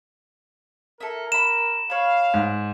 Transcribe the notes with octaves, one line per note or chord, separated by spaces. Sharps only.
E4 A4 A#4
A#5 B5 E7
C#5 F5 B5
G#2